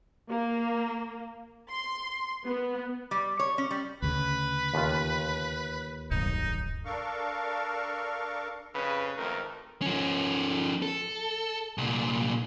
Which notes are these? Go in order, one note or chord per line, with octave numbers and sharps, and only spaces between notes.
A#3
C6
B3
G3
C#5
C#4
G3
D2 C#3 B4
D#2 F4
D1 B1 G2 D#4
D4 A4 A#4 F5 C#6
F2 C#3 B4
G#1 F2 A3 A#4
F3 C#4
A4
C2 A#2